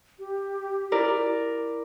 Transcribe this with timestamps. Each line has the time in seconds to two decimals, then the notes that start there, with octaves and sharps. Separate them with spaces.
0.19 G4
0.92 E4 A#4 D5